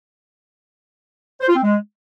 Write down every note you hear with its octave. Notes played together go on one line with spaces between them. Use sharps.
C5
F4
C4
G#3